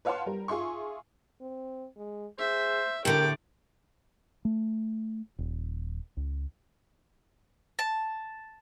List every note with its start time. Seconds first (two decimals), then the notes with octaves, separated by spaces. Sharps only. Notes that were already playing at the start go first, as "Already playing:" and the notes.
0.05 B4 C#5 F5 F#5 A5 C6
0.26 G3 A#4
0.48 F4 G#4 E5 C6 C#6
1.41 C4
1.97 G#3
2.39 G#4 C5 E5
3.05 A2 D3 G4 A#4 G5 D6
4.45 A3
5.39 D#1
6.17 C#2
7.79 A5